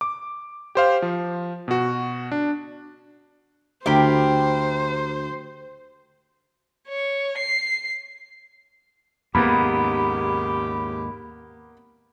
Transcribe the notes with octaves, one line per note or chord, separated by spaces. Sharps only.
D6
G4 C5 F5
F3
B2 F#4
D4
D2 G4 A#4 C5 B5
C#5
C7
D#2 G#2 C#3 A#3 B3 G4 B5